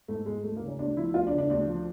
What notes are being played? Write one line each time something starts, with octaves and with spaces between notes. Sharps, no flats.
G#2 A3
G#2 G#3
D2 A3
A#3
C#3
C#4
D2 D4
F3 E4
D2 F4
D4
C#3
D4
D2 D4
F3